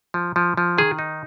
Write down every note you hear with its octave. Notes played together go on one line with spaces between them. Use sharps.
F3
F3
F3
D#3 G#4
D#4